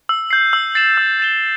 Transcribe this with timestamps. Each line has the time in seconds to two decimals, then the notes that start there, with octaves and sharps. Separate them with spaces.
0.09 E6
0.31 G6 C7
0.53 E6
0.75 A6 C7 E7
0.97 E6
1.20 A6 E7 G7